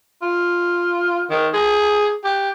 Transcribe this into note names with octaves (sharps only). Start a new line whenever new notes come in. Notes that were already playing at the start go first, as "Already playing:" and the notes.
F4
D#3
G#4
G4